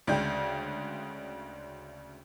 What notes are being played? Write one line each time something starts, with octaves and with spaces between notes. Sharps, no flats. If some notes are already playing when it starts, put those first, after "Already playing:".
D2 C#3 G#3 D4 G5 G6